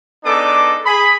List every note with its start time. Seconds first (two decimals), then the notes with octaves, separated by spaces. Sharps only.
0.25 B3 D4 D#4 G#4 A4 D6
0.85 G#4 B5